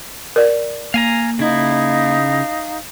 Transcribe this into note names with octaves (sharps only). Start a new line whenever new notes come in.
A#4 D5
A#3 F5 G#5 A#5
C#3 D#4 E4 F5